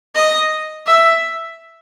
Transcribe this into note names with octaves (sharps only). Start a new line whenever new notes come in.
D#5
E5